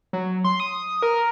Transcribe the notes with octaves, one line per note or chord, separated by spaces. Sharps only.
F#3
C6
D#6
A#4